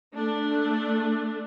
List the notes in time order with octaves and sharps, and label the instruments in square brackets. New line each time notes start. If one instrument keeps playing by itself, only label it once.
[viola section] A3 D4